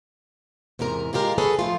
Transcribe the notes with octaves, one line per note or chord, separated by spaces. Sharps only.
E2 G#2 C3 A#4 A#5
A#2 G#3 F4 G4 A#4
G#4 A4 B4 C#5
F3 A3 F4